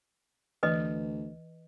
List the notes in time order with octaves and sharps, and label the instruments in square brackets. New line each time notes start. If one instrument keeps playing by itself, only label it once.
[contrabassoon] D2 [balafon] E3 [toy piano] B4 D#5